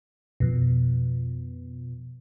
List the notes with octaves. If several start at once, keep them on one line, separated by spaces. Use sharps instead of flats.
F2 B2